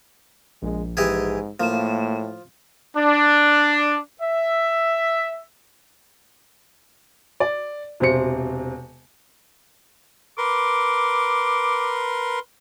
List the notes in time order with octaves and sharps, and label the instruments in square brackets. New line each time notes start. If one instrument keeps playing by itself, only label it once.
[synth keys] A#1 [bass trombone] G#3
[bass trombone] G#2 [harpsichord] E3 G4 G#4
[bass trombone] A2 [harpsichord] F3 [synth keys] A#3 E7
[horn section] D4
E5
[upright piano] D5
E1 C3 C5 C#7
[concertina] A#4 B4 C6 [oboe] D6